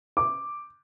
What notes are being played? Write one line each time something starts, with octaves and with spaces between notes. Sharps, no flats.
D6